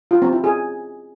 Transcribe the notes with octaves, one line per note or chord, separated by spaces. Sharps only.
F4
C4
E4
G#4